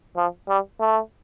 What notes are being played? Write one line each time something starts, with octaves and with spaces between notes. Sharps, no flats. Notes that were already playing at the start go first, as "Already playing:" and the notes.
F3
G3
A3